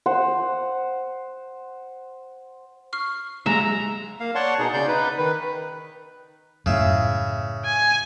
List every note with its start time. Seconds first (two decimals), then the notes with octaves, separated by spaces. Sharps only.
0.06 C5 F#5
2.93 C#6 F6 C7
3.46 F#3 G#3 G4 E5 F5 A#5
4.20 A#3 F5
4.35 C#5 D5 F#5 A5 C6 C#6
4.59 B2 D#4 G#4
4.74 C#3 D5 G6
4.88 D#4 B4
5.18 D#3 B4
6.66 F#2 A2 C#3 E5
7.65 G#5